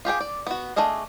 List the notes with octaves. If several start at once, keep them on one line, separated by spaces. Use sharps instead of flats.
F4 G4 G#4 G5
D5
B3 F#4
A3 D4 G#4 D#5 F5